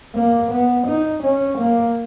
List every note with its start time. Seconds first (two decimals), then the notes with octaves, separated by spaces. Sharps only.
0.15 A#3
0.51 B3
0.87 D#4
1.23 C#4
1.58 A#3